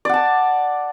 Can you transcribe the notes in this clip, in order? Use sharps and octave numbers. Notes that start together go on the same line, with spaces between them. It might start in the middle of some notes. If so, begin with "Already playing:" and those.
D5 F#5 A5